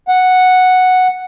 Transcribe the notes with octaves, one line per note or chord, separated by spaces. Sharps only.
F#5